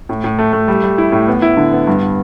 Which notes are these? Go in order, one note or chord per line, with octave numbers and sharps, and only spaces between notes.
A2
A2
A3
A3
G3
G3
E4
A2
B3
E4
D3
B3
G2